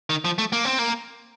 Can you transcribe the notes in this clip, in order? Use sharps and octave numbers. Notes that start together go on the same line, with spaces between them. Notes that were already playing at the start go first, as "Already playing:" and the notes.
D#3
F3
A3
A#3
C4
A#3